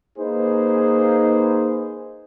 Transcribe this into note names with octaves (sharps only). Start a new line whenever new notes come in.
A#3 D#4 G#4 B4 C5